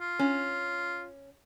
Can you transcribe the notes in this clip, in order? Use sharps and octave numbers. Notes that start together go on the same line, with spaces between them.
F4
C#4